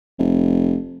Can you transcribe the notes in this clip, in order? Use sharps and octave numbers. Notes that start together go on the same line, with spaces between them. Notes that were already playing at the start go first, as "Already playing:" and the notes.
F1